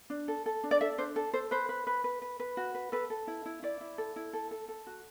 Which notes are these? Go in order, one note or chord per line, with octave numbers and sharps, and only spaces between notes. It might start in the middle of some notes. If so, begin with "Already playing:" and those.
D4
A4
A4
D4
D5
A4 E5
D4 C5
A4
A4 C5
B4 C5
B4
B4
B4
B4
B4
F#4
B4
A4 B4
A4
E4
E4
E4 D5
E4
A4
E4
A4
A4
A4
F#4